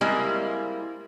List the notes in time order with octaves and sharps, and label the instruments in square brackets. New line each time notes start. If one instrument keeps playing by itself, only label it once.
[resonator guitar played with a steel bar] G3 G#3 A#3 C4 E4